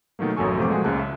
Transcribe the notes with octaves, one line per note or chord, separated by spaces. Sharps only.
B2 D#3 F#3 A3 A#3
A1 F#2 F#3 A4 G#5 C#6
C3 F3 A3 B3 C5 D6
A#2 F3 G#3 A3 F#4 G#4
C#2 C#3 G#3 A5 F#6
E5